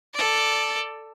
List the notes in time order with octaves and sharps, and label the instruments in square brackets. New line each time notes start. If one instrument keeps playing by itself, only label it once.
[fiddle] A4 D5